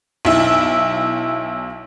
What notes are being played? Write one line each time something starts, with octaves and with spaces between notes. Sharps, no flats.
B1 E4